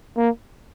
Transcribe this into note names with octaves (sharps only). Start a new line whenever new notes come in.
A#3